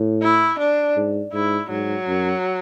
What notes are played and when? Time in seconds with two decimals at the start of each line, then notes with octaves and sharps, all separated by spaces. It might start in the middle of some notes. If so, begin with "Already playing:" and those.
Already playing: A2
0.22 E4
0.59 D4
0.96 G#2
1.33 G#2 E4
1.70 G#2 F#3
2.07 F#2